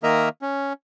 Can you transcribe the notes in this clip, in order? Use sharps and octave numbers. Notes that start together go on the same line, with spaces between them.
D#3 A#3 A#4 D#5 E5 A#5
C#4